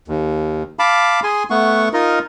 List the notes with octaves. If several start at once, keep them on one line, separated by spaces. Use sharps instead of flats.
D#2
F5 A5 B5 D6
G#4 G#5 C6
A3 B3 F#5 C#6
D#4 F4 A#4 D#5